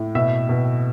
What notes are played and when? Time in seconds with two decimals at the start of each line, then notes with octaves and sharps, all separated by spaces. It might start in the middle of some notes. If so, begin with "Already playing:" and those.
Already playing: A2
0.15 B2 E5
0.49 B2